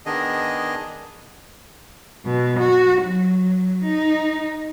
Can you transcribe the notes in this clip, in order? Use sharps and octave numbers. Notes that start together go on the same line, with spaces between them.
D#3 B3 D4 G#4 D#5
B2
F#4
F#3
D#4